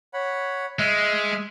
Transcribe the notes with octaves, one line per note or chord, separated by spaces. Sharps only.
C#5 F#5 B5
G#3 D#5 E5 F6